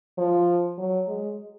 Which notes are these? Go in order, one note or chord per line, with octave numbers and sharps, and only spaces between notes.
F3
F#3
G#3